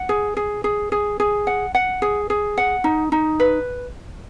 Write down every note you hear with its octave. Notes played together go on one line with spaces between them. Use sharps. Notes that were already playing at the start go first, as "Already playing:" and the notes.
Already playing: F#5
G#4
G#4
G#4
G#4
G#4
F#5
F#5
G#4
G#4
F#5
D#4
D#4
B4